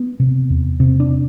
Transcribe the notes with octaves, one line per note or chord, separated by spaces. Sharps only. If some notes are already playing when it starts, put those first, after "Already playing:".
Already playing: B3
C3
E2
C3 C4
D4